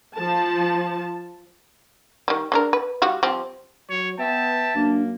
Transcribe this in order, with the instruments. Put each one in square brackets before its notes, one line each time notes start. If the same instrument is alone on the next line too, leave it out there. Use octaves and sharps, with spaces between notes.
[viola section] F3 A5
[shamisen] D#3 G3
G#3 D4 A#4
B4
G3 F#4 F5
F3 G3 C4
[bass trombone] F#3 [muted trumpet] C#5
[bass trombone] B3 [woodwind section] E5 G5 [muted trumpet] A5
[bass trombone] F#2 [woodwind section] A#3 [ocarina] D4